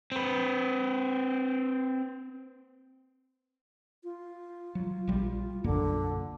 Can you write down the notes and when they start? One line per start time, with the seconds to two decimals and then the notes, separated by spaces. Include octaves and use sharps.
0.12 C4 B4
4.04 F4
4.75 F#3
5.07 A#1 G3
5.64 B1 F#2 D3 A#3